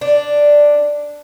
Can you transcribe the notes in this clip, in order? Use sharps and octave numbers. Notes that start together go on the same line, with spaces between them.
D4